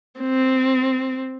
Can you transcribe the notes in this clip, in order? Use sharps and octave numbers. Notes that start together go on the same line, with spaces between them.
C4